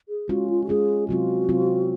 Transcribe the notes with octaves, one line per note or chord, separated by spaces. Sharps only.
G#4
G#3 C#4 F4 F#4
F4
F#4
G#3 C#4 F4 G#4
C3 F#3 C4 F4 F#4
C3 F#3 C4 F4